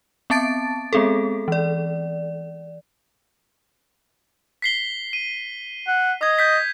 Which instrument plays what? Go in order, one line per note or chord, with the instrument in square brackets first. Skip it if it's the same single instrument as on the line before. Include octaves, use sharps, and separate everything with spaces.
[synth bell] B3 C4 A5 A6 D7
G#3 B3 C4 G#4 A4
E3 D5
[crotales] B6 C7 G7
D#7
[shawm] F#5
[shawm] D#5 [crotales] D#6 G#6
[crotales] G6 B6